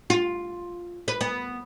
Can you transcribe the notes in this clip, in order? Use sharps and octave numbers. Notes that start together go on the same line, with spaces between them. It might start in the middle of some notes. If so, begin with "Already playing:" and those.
F4
B4
B3